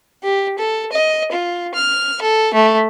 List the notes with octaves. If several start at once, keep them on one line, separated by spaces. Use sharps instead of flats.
G4
A4
D#5
F4
F6
A4
A3